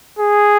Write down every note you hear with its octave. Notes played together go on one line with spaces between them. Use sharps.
G#4